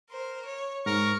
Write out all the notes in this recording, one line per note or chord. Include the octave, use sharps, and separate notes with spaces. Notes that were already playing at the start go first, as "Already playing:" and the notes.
A#4 C5
C#5
G#2 A#4 C#6